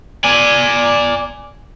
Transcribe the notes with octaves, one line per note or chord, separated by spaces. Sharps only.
D5 G#5